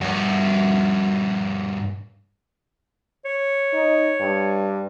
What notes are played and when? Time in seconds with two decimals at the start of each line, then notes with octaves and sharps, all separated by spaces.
0.01 G2 F#4
3.25 C#5
3.73 D#4
4.20 G2